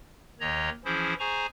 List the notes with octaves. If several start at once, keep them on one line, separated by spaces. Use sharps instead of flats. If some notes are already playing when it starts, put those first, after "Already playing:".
D#2 D#3 C#5 D#5 A#5
E3 F3 C#4 E4 G#4 C5
G#4 C5 G#5 A#5 C#6